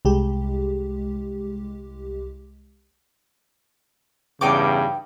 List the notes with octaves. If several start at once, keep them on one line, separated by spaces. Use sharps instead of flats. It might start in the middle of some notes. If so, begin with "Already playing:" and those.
C2 G#3 G4
E2 G2 C#3 D#4 G5 D6